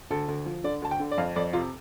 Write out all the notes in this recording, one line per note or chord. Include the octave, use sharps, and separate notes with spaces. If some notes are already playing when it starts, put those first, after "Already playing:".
D2 A4
D2
F3
D3 D5
D2 A5
G5
D3
D5
F2 F5
F2 D5
C3 F4